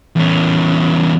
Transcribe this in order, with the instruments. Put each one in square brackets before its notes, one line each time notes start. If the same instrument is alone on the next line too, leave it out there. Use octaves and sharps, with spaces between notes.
[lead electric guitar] E2 C#4